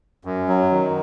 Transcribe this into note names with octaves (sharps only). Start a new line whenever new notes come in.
F#2
F#3
D#3